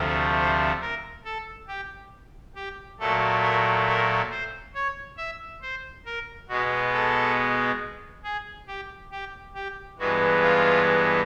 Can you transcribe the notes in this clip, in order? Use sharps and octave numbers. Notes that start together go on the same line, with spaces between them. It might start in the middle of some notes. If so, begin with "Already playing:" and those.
Already playing: D2 C3 F3 A3
C5
A#4
A4
G4
G4
A#2 F#3 A3 A4
A#4
A#4
C5
C#5
E5
C5
A#4
B2 G#3 B3 F#4
A4
G#4
G4
G4
G4
G2 E3 G#3 B3 F#4
F4